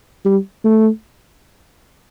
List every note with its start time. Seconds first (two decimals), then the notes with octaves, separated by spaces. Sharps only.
0.25 G3
0.64 A3